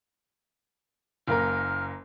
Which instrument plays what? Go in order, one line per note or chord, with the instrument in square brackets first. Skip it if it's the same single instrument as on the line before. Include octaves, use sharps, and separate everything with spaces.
[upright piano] F#1 A#3 A#4 [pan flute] F6